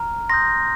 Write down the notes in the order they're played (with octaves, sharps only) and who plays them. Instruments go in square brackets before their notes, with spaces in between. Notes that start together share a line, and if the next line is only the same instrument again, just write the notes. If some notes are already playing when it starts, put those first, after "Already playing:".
Already playing: [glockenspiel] A#5 F6
C6 D#6 G6 A#6